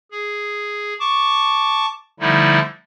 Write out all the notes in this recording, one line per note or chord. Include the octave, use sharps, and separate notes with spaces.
G#4
A5 C#6 D6
D3 F3 G3 A3 D#4 E4